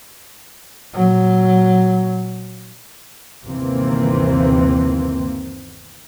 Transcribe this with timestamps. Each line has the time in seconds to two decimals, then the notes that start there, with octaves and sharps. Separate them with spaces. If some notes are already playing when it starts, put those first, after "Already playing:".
0.94 A#2 F#3
3.46 G1 D#2 C3 E3 A#3 C4